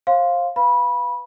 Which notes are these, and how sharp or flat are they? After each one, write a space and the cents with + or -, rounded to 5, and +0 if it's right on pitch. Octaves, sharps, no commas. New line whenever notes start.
C5 +30 F5 +5 C6 +0
B4 +10 F5 +0 B5 -20